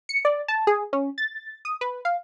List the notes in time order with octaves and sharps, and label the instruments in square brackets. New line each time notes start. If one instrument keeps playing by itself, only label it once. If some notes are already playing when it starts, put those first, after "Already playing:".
[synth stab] C#7
D5
A5
G#4
C#4
A6
D#6
B4
F5